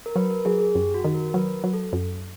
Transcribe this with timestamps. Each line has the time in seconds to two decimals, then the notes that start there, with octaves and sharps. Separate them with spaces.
0.06 A#4
0.16 F#3 B4
0.31 A#4
0.45 F#3 G#4
0.60 G#4
0.75 F#2 G4
0.94 F#4
1.05 D#3
1.14 A#4
1.30 A#4
1.34 F#3 B4
1.64 F#3
1.73 A4
1.93 F#2